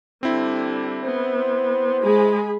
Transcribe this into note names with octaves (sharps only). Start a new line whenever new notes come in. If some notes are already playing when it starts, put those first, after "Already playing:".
D3 G3 C4 E4
B3 C5
G#3 G#4 B5